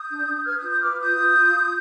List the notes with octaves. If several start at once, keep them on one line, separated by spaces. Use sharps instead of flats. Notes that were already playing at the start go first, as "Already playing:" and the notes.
Already playing: D#6 G6
D4
D4
B4 F6 G#6
D#6 G6
F4
D#6 G6
B4 D6 F6
F4 D#6 G6
F4
F4
F4